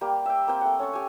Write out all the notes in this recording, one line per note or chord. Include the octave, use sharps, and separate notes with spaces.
G3 A#3 G4
E5 G5
A#3 C4 G5
A3 F#5
C#4 A4 C#6
G4 G#5